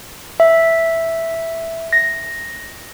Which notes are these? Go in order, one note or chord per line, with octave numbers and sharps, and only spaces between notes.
E5
A#6